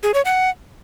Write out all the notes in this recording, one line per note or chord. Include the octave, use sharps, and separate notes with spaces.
G#4
C#5
F#5